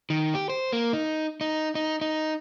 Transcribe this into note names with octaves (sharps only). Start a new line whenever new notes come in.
D#3
G4
C5
A#3
D#4
D#4
D#4
D#4